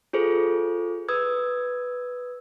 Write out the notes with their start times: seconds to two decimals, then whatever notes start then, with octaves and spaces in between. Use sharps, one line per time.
0.13 F4 G#4 A4 C5
1.08 B4 D#6 E6 G#6